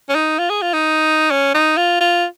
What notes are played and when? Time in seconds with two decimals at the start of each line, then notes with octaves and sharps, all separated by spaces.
0.09 C#4
0.15 D#4
0.39 F4
0.50 G#4
0.62 F4
0.73 D#4
1.31 C#4
1.54 D#4
1.77 F4
2.01 F4